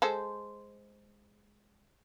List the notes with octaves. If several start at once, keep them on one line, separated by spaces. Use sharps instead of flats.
G#3 A4 C5